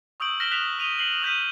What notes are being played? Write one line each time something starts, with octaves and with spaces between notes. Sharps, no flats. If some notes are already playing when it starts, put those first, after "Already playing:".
C#6 D#6 E6 G6 D7 F#7
F6 A#6 B6 D7 E7 G7
E6 F#6 B6 E7 F7
D#6 D#7 F7 G7
C7 F#7 G7
D#6 F6 G6 A#6 B6 D#7